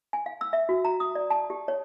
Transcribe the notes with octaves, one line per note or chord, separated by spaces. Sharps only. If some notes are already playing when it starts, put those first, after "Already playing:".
G#5
F5
E6
E5
F#4
A#5
D#6
D5
A5
G4
C#5